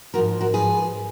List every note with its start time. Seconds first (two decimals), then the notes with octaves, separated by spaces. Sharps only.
0.14 F3 F#4 A#4
0.18 G#2
0.41 F#4 A#4
0.54 G#2 F3 G#4 B4